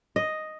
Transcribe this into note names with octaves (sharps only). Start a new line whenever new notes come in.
D#5